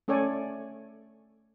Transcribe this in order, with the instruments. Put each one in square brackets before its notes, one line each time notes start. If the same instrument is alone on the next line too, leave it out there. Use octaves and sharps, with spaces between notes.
[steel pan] A3 C#4 A4 C#5 D5 G#5